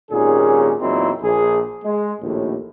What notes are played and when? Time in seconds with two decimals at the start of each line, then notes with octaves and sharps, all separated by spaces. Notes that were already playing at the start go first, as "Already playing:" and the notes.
0.11 G#1 D#2 A#2 D#3 C#4 G#4
0.81 E2 A#2 F#3 C4 D#4 E4
1.22 A#1 G#4
1.84 G#3
2.22 A#1 D#2 A2